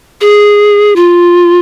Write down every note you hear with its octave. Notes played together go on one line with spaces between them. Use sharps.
G#4
F4